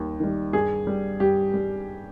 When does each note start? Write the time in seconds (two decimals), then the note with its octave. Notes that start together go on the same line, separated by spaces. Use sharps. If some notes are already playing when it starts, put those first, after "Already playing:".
Already playing: D#2 D#3 G3
0.20 D#3 G3
0.53 G2 G#4
0.87 G3
1.20 G2 G4
1.54 G3